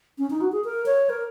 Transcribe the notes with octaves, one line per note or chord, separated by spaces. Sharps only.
C#4
D#4
F#4
G#4
A#4
C#5
A#4